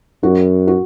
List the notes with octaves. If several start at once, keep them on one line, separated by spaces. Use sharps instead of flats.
F#2 F#4
F#4